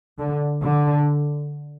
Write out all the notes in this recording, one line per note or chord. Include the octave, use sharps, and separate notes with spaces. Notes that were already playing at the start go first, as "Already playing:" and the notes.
D3
D3